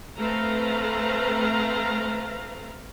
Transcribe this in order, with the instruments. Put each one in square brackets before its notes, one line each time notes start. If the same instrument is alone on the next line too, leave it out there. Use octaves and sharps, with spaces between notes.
[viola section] A3 C4 A4 B4 F5 A#5